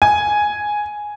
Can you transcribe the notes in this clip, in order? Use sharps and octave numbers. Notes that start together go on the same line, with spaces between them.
G#5